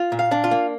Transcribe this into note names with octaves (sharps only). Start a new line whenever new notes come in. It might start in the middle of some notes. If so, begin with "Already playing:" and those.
Already playing: F4
A#2
F5
D4
F4
A#3